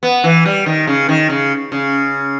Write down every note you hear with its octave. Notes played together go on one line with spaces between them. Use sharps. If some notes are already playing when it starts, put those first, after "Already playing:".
B3
E3
G3
D#3
C#3
D#3
C#3
C#3